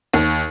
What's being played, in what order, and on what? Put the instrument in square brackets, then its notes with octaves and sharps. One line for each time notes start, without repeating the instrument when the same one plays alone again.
[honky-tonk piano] D#2